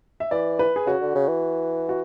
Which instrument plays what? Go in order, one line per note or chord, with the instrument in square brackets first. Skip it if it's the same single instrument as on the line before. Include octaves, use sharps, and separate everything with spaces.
[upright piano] E5
[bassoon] E3 [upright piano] D5
[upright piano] B4
G#4
[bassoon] C#3 [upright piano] F#4
[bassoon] D3
C#3
E3
[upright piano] F#4